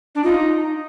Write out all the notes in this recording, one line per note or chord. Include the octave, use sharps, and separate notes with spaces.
D4
D#4 F4